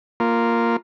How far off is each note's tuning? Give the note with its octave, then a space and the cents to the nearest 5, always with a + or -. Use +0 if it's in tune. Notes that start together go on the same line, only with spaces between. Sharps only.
A#3 -5 F4 +0